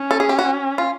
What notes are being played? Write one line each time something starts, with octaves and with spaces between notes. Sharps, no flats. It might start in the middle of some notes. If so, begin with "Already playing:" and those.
Already playing: C#4
A4
G#4
G4
F#4
F4